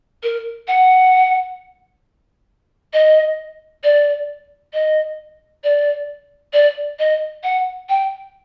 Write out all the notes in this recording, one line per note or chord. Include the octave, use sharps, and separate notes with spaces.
A#4
F#5
D#5
D5
D#5
D5
D5
D#5
F#5
G5